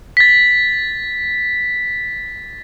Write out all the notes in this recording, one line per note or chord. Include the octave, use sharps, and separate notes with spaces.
A6 B6